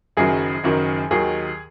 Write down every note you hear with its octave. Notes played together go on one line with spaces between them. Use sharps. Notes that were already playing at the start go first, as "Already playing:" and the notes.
F#1 F#2 D#3 F#3 G#4
F#1 F#2 D#3 F#3
D#2 D#3 F#3 G#4